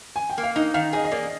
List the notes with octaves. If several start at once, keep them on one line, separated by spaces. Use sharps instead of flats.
G#5
G5
A#3
F5
D#4 D#5
D#3 F5
G#4 D#5
D#5
A#3 D5